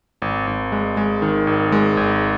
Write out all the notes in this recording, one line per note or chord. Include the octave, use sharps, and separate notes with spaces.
G#1
G#1
G#3
G#3
D#3
G#1
G#3
G#1